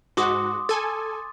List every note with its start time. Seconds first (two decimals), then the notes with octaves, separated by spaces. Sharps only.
0.17 G#2 F#4 C6 D6 D#6
0.69 A4 G#5 A6